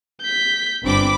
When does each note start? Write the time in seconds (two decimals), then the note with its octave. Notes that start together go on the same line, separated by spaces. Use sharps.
0.21 G6 B6
0.84 G1 C4 D4 B5 D6